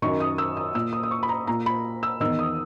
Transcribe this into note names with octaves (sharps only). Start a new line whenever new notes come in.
F#2 D#3 C#6
D#6
E6
D#6
A#2 E6
D#6
D#6
C#6
B5
A#5
A#2 A#5
B5
E6
E2 D#3 E6
D#6